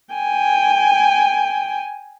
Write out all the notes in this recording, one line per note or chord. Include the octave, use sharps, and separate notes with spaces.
G5 G#5